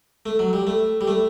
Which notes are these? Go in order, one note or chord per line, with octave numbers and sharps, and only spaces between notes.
A3
F#3
G3
A3
G3
A3